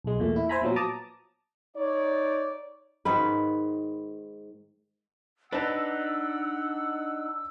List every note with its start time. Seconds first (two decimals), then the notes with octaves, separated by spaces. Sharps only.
0.04 B1 G#3
0.19 E2 A#2 A3
0.36 E4
0.49 C5 E5 G#5 A#5 B5
0.61 A#2 F3 F#3 B3
0.76 A5 A#5 D6 D#6
1.77 D#4 C#5 D5
3.05 G#2 D#3 B4
5.52 D4 D#4 B4 F#5 A5 E6